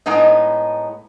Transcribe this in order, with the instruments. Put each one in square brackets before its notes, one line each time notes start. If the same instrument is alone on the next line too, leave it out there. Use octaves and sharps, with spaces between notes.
[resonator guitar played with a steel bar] A2 G#3 B3 D#4 D#5